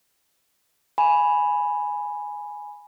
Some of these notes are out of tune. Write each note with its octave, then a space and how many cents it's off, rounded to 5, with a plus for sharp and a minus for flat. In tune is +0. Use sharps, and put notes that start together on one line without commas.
G#5 +0 B5 +0